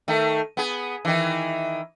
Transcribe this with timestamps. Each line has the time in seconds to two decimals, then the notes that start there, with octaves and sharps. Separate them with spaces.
0.08 D#3 A3
0.57 B3 G#4
1.05 D#3 E3